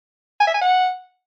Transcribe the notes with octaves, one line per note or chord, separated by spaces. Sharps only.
G#5
E5
G#5
F#5